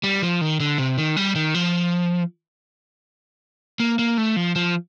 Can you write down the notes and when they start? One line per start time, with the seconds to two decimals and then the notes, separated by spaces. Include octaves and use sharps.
0.04 G3
0.23 F3
0.41 D#3
0.60 D3
0.78 C3
0.98 D#3
1.17 G3
1.35 D#3
1.54 F3
3.80 A#3
3.99 A#3
4.18 A3
4.36 F3
4.56 F3